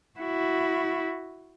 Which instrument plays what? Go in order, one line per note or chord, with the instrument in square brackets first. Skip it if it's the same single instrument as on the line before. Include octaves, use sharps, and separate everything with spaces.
[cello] E4 F#4